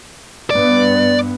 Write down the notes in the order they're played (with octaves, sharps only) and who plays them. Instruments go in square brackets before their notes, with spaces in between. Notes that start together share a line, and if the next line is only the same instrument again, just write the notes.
[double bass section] G2 B3 [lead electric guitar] D5